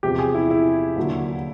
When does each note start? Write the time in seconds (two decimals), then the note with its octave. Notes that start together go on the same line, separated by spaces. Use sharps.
0.03 E2 C3 F3 G4
0.19 G#4
0.35 E4
0.50 E4
0.96 D#2 D3 F#3